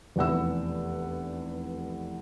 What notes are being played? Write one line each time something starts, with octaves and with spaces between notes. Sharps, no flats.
F1 E2 F#5 E6